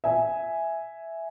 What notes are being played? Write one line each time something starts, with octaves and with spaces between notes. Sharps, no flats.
E5 G#5